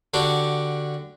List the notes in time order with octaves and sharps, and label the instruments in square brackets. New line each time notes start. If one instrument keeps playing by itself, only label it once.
[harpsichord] D3 D4 F#4 G4